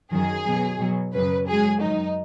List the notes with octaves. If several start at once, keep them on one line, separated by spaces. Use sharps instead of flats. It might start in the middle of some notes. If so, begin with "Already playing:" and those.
F#2 D#3 F#3 G#4
B2 F#3
B2 F#3
F#2 C#3 F#3 B4
G#2 F#3 G#4
F#2 D#3 F#3 D#4